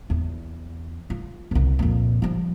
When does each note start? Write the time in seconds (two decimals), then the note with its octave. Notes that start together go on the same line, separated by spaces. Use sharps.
0.10 E2
1.10 F4
1.51 E1 C2
1.79 F2 A#2
2.22 F3 G3